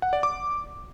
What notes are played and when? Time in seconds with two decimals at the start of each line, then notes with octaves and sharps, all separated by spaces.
0.02 F#5
0.13 D5
0.23 D6